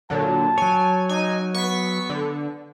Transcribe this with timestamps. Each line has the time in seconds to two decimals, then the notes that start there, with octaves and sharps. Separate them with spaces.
0.10 A#2 D3 F#3 A5
0.58 F#3 C#5 G#5
1.09 D#4 G#5
1.54 B3 C#6 B6
2.10 D3